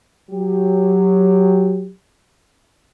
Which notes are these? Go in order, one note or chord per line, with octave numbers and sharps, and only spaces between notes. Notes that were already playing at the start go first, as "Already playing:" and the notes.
F#3 G4